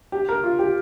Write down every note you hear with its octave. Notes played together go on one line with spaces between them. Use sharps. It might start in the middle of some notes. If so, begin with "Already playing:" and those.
G4
A#4
F4
G4